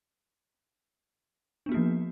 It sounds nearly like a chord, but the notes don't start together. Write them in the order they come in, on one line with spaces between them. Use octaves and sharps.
D4 B3 F#4 A#3 F3